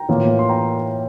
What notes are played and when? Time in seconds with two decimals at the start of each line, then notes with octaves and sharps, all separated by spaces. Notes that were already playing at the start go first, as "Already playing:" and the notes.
Already playing: G5 A#5
0.09 A2 E3 A#3 F4
0.39 C6
0.49 G5 A#5